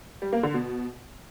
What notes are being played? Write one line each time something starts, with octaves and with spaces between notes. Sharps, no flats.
G3
A#3
D3
B2